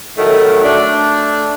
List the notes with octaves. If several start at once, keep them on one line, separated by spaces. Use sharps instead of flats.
A2 D#3 F#3 A3
A3 D4